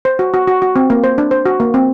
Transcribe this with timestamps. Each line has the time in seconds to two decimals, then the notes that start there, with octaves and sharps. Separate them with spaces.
0.05 C5
0.19 F#4
0.34 F#4
0.48 F#4
0.62 F#4
0.76 C4
0.90 A#3
1.04 C5
1.18 D4
1.31 C5
1.46 F#4
1.60 A#3
1.74 C4